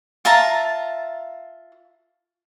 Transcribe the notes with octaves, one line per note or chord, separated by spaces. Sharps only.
F4 E5 A5 A#5